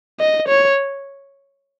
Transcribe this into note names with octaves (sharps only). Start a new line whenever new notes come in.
D#5
C#5